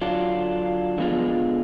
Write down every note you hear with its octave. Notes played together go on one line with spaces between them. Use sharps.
D3 F#3 D4 F4
D3 F3 G#3 B3 F4